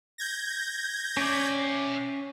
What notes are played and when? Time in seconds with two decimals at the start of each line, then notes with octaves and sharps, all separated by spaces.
0.18 G6 G#6 A#6
1.17 C#4 D5 E5 G5